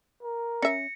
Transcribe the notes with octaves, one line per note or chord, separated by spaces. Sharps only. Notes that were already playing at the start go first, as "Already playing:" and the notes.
A#4
C#4 E5 A#6 C#7